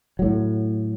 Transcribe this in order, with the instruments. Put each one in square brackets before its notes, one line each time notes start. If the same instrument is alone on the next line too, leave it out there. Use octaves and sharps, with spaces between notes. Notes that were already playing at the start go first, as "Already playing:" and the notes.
[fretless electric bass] A2 F#3